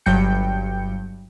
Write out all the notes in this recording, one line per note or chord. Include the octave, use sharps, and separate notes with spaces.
G1 G2 F#3 G5 G6 C#7